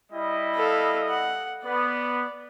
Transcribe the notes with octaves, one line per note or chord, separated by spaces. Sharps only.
G3 E4 D#5
A4 F5
F#5
B3 D5